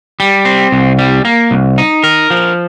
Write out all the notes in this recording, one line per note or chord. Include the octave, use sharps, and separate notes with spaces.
G3
C4
C2
G3
A#3
C2
D#4
A#4
F3